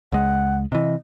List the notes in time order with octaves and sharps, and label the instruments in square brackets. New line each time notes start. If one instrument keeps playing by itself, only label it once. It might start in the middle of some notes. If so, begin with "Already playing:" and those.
[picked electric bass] C#2 G#3 [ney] F#5
[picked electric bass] C3 E3 [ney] D#5